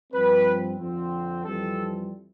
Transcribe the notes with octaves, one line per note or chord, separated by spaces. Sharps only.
G2 F3 C4 B4
F2 D3 F3 C4
F2 E3 G3 C4 A4